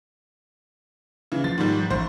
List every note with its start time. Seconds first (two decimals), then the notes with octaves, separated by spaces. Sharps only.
1.32 C#3 E3
1.44 F3 A6
1.58 G#2 D#3 G3
1.90 A1 C5